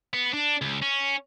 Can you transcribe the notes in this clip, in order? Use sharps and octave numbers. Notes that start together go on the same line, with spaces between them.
B3
D4
C#2
C#4